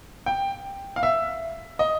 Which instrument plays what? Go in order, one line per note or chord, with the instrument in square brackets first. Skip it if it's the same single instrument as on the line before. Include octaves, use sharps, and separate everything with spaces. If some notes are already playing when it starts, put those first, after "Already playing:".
[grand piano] G5
F5
E5
D#5